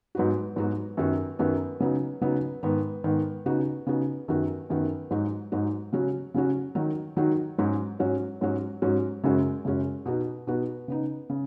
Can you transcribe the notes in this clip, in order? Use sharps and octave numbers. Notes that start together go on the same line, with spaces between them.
G#2 F#3 B3 D#4 F#4
G#2 F#3 B3 D#4 F#4
F#2 D#3 B3 F#4
F#2 D#3 B3 F#4
C#3 F#3 B3 D#4
C#3 F#3 B3 D#4
G#2 D#3 B3
G#2 D#3 B3
C#3 B3 D#4 F#4
C#3 B3 D#4 F#4
F#2 D#3 B3 F#4
F#2 D#3 B3 F#4
G#2 F#3 D#4 F#4
G#2 F#3 D#4 F#4
C#3 F#3 C#4 F#4
C#3 F#3 C#4 F#4
D#3 F#3 D#4 F#4
D#3 F#3 D#4 F#4
G#2 F#3 C#4 F#4
G#2 F#3 C#4 F#4
G#2 F#3 C#4 F#4
G#2 F#3 C#4 F#4
F#2 C#3 G#3 C#4 F#4
F#2 C#3 G#3 C#4 F#4
B2 B3 D#4 F#4
B2 B3 D#4 F#4
C#3 B3 D#4
C#3